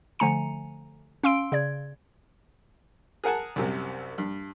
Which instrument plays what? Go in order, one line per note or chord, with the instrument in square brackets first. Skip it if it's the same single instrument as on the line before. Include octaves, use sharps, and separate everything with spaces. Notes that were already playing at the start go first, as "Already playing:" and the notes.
[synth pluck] D3 F3 A3 G#5 A#5 C#7
C#4 F5 C6 E6 D7
C#3 D5 G#6
[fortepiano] G#4 A#4 F#5 G#5 A5
C2 F#2 C3
G2